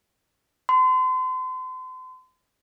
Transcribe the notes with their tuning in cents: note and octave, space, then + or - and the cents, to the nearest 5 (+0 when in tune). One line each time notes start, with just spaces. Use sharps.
C6 -40